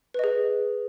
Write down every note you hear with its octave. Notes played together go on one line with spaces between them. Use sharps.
G#4 B4 D#5